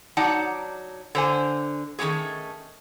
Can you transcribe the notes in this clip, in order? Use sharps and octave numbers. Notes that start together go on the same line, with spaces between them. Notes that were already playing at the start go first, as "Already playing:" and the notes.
F#3 D#4 D5 F#5 A5
D3 C5 G#5
D#3 G3 A3 C#4 G#4